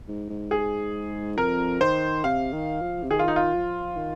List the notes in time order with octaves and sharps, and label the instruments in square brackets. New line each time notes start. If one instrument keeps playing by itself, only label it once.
[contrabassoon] G#2
G#2
[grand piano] G#4
[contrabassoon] F2 [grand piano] A#4
[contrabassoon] D#3 [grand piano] C5
[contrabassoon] C3 [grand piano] F5
[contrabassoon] D#3
F3
C3
[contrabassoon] D#3 [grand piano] G#4
[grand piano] F4
D#4
F4
[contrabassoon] F3
D#3